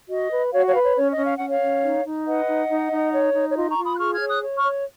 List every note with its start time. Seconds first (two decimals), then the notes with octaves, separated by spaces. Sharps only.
0.10 F#4 D#5
0.32 B4
0.53 F#4 C#5 F5
0.68 C#5 F5
0.75 B4
0.82 C#5
0.96 C#4 C#5
1.11 D#5
1.18 C#4
1.26 F5
1.36 C#4 F#5
1.48 C#5 F5
1.61 C#4
1.84 D#4
2.05 D#4
2.26 B4 D#5 F#5
2.48 D#4
2.70 D#4
2.92 D#4
3.13 C#5
3.34 D#4
3.50 C#5
3.56 F4 D#5
3.71 A#5 C#6
3.78 F4
3.85 B5 D#6
3.94 F#6
3.99 G#4 C#6 F6
4.14 F6 G#6
4.21 C#5
4.28 D#6 F#6
4.42 C#5
4.57 C#6 F6
4.64 C#5